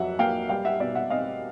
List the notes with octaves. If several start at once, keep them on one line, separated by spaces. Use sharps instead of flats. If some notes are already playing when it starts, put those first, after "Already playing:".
Already playing: F2 F#3 E5 F#5
A#3 F5 G5
G3 F5 G5
E5 F#5
B2 D5 E5
E5 F#5
C4 D#5 F5